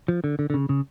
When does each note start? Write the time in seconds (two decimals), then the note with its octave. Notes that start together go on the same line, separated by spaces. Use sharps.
0.08 F3
0.24 D3
0.39 D3
0.50 D3
0.54 C#3
0.69 C#3